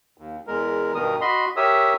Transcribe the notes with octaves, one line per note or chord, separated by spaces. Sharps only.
D#2
E2 G#3 A#4
G2 B2 D#3 A#4 D#6
F#4 D#5 B5 C6
G4 A#4 C#5 E5 D#6 E6